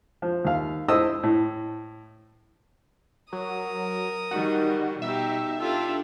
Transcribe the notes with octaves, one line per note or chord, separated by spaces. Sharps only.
F3
D#2 F5
E4 C5 D#5 D#6 E6
A2
F#3 A#4 D#6
D#3 G3 F#4
B2 D#4 G4 E5
D4 F4 G4 A4